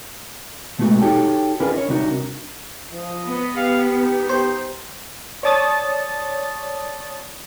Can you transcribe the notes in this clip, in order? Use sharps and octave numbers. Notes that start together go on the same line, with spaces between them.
B2 G#3 A3 B3 F#4
D#4 F#4 G4 A4 C#5 G5
C#4 D4 F4 G#4 A#4 B4
C#5 D#5
C2 C3 D4 D#4 F#4 A#4
F3 D#5
B3
G4 F5
D#4
G4 C5
C#5 D5 A5 D#6 A6